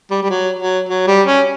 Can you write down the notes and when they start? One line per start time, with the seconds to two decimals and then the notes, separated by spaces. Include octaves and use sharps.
0.11 G3
0.23 G3
0.30 F#3
0.59 F#3
0.89 F#3
1.08 G3
1.27 C#4